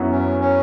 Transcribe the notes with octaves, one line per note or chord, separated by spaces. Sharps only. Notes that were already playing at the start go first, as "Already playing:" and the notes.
Already playing: F#2 F#3 B3 E4 C#5
C#4
C#4